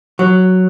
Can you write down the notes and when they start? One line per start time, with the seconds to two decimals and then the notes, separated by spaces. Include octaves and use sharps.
0.19 F#3